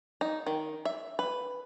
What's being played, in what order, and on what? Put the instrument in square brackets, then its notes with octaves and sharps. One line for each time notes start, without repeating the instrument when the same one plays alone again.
[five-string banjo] D#4
D#3
E5
B4